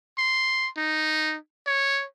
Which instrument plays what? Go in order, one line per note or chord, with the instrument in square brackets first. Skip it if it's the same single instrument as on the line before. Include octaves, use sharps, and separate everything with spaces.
[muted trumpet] C6
D#4
C#5